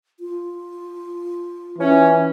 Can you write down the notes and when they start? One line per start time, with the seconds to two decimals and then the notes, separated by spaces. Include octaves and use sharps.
0.20 F4
1.78 E3 C#4